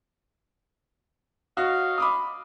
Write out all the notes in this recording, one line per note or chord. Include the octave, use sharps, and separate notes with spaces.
F#4 C#5 D#5 F5
B5 D6 D#6